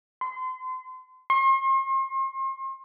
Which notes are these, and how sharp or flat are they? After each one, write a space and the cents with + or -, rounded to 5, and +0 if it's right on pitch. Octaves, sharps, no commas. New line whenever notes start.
C6 -35
C6 +40